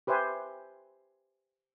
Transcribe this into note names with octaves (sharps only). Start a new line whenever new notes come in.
G4 B4 C5 E5 G#5